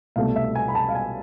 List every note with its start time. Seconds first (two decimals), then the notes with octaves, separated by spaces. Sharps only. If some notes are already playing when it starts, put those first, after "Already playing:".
0.16 C2 B2 A3 F5
0.36 E5
0.55 G#5
0.68 B5
0.75 A5
0.89 F5
0.95 G#5